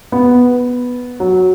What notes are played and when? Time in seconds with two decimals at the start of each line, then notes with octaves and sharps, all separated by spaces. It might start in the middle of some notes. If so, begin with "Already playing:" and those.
0.12 B3
1.20 F#3